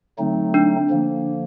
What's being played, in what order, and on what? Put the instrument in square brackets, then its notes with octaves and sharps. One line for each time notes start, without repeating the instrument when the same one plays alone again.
[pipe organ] D3 F#3 A3 C4 D#4
[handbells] D4
[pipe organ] D3 F3 A#3